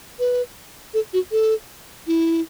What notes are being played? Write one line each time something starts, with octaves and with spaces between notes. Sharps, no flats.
B4
A4
F#4
A4
E4